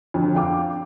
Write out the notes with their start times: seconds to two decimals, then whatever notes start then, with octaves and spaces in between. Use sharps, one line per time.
0.14 F2 D3
0.35 F5 G5 D6